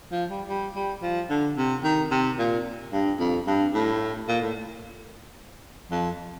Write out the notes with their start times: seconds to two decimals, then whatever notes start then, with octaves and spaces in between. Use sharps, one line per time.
0.12 F3
0.30 G3
0.49 G3
0.76 G3
1.02 F3
1.30 D3
1.57 C3
1.84 D#3
2.11 C3
2.39 A#2
2.93 G2
3.20 F2
3.47 G2
3.74 A2
4.28 A#2
4.42 A2
5.91 F2